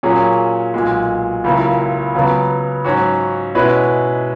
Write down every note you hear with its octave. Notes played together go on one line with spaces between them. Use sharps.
A#2 F#3 A#3 C#4 G#4
B1 A#2 G#3
C#2 C#3 F#3 A#3 E4
C#2 C#3 F#3 B3
G#2 F#3 C#4 F#4
B2 G#3 C#4 E4 B4